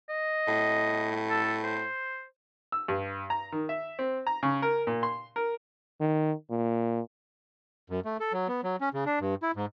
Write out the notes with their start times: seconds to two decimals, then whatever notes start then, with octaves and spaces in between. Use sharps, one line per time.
0.10 D#5
0.48 A2
1.30 A4
1.64 C5
2.72 E6
2.88 G2
3.30 A#5
3.52 D#3
3.69 E5
3.99 C4
4.27 A#5
4.43 C#3
4.62 A#4
4.87 A#2
5.03 C6
5.36 A#4
6.01 D#3
6.51 A#2
7.90 F#2
8.05 A3
8.20 A4
8.33 F#3
8.48 B3
8.64 F#3
8.81 C#4
8.94 C#3
9.06 D4
9.20 G2
9.43 E4
9.56 G#2